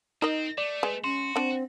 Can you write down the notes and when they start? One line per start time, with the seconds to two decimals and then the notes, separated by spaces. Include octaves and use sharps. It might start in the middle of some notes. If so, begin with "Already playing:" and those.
0.22 C4 D#4 A#4 D#5
0.58 A3 D5
0.83 G#3 B4
1.04 C#4 F#4 C6
1.36 C4 D4 F#5